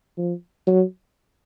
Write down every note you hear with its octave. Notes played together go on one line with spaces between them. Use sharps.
F3
F#3